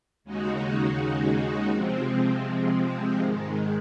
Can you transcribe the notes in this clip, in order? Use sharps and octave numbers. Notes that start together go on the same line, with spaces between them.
D#2 C#3 G#3 D#4 F#4
C3 F3 G#3 C4
G#2 D#3 G#3